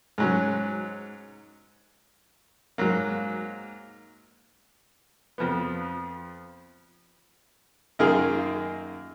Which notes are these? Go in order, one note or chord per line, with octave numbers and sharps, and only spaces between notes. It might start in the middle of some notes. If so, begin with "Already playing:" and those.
G#2 F#3 C#4
G#2 F#3 A#3
F2 F3 B3
F#2 D#3 A#3 F4 G#4